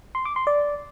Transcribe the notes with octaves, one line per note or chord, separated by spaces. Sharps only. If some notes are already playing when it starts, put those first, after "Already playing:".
C6
D6
C6
D5